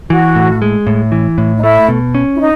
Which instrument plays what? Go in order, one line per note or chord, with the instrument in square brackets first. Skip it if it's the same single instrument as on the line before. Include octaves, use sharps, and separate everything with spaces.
[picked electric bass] E3 [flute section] F#4
[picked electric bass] A2
G#3
A2
E3
A2
[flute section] D#4
[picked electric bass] A3 [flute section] E4
[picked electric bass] B2
C#4
[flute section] E4
D#4